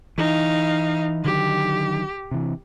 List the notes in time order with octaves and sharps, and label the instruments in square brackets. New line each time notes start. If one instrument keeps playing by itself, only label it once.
[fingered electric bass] E3 [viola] D#4 F5
[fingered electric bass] D3 D#3 F#3 [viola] G4
[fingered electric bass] C3 E3